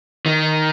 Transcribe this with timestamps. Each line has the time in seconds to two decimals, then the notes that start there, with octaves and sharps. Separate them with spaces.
0.26 D#3